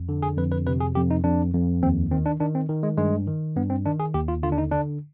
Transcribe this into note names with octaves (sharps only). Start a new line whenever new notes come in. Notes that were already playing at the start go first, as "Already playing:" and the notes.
Already playing: F2
D3
G#4
F2 B4
B4
C3 B4
G#4
F2 G4
D#4
F2 D4
F2
D#2 C4
D#3 C4
D4
D#3 D4
C4
D#3
G#3
G2 G#3
D#3
G2 B3
C4
D#3 D4
G#4
D#2 G4
F4
D3 F4
D4
D#4
D3 D4